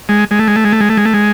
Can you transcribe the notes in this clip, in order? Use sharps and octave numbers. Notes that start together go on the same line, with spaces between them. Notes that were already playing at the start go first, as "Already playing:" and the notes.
G#3
G#3
A3
G#3
A3
G#3
A3
G#3
A3
G#3
A3
G#3